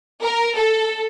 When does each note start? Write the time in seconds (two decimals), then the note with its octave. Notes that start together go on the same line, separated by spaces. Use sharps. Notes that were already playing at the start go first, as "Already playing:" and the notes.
0.22 A#4
0.56 A4